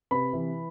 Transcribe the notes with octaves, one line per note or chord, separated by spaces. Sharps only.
C3 B4 B5
E3